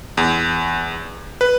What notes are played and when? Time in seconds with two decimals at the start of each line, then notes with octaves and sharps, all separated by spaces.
0.17 E2
1.41 B4